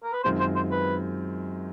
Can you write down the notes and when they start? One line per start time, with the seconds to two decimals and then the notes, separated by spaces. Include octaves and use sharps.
0.03 A#4
0.13 B4
0.23 F#2 D#3 G#3 C4 F4 C5
0.40 C5
0.55 C5
0.71 B4